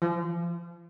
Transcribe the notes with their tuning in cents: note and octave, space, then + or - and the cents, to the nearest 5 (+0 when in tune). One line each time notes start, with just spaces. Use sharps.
F3 -35